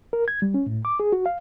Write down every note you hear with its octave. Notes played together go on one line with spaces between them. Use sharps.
A#4
G#6
G3
C#4
A2
D6
G#4
F#4
F5